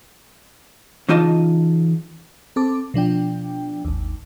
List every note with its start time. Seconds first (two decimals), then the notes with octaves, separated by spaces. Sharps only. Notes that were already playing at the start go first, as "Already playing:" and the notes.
1.09 C#3 E3 D#4 F4 D#5 A5
2.56 C4 A4 D6
2.94 B2 F3 D4 G5
3.85 G#1 D#2